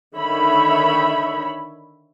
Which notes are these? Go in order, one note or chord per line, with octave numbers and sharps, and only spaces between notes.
D3 D#3 C#5 E5 B5